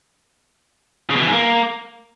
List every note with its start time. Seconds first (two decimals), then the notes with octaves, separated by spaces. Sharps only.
1.10 C#3
1.16 B2
1.21 E3
1.27 G#2
1.32 A#3